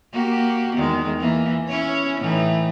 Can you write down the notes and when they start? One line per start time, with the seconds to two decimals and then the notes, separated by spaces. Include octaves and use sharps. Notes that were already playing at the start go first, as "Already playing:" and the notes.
0.12 A#3 F#4 G4
0.75 E2 D#3 G#3
1.19 E3 A#3
1.68 C#4 E4 C#5
2.20 A2 E3 D#4